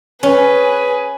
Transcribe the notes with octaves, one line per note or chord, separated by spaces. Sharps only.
C#4 G#4 B4 G#5